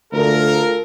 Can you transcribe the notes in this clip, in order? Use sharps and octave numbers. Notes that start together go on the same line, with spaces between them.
D2 F4 A4 A#4